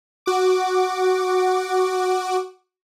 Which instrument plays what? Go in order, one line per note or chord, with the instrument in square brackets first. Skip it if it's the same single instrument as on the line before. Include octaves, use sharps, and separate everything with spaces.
[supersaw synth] F#4 D6